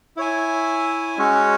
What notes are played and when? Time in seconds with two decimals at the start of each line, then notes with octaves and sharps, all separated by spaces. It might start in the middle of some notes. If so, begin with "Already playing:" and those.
0.17 E4 C#5 E5 G#5
1.18 G#3 C#4 F#4 C#5